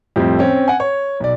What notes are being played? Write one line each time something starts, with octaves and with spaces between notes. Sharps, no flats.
F2 A2 F3 G3 C4
C4 C#4
F#5 G#5
C#5
B1 D5